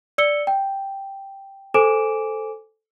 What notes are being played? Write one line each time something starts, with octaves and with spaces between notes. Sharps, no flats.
D5 E6 C#7 G7
G5
A4 C5 G#5 D6 D7 E7